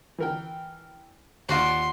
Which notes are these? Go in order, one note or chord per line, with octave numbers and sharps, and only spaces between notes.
E3 A#4 G5
D#2 F4 F#4 D5 F5 C6